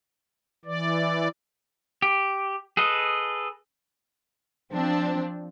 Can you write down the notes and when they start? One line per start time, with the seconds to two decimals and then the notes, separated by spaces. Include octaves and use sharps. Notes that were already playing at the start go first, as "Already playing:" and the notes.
0.65 E3 D5
2.02 G4
2.77 G#4 A4 B4 D#5
4.72 F3 C4 D4